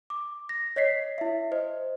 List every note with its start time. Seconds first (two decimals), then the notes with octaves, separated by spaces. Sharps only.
0.10 D6
0.49 A#6
0.76 C#5 D#5 B6 C7
1.18 E4 E5
1.52 C5 D#5